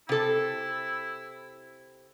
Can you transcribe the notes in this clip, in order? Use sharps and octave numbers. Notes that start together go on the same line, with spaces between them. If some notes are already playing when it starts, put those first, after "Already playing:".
C3 E4 A4